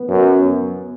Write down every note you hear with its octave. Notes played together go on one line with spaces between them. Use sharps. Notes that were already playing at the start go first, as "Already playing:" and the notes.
Already playing: B3
F#2